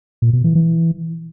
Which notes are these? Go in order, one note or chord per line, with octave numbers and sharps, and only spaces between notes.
A#2
B2
E3
E3